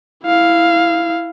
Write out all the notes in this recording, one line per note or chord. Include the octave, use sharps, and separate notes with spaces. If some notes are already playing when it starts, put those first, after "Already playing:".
E4 F5